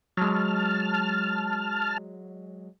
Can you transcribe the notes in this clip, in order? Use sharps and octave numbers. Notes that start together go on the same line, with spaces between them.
F#3 G#3 A5 F6